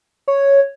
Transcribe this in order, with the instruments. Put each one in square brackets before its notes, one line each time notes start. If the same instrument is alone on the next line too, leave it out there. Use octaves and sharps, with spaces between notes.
[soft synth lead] C#5